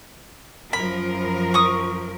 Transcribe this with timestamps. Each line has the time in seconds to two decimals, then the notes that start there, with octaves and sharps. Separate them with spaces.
0.73 F#2 F3 A#4 B5
1.54 C#6 D#6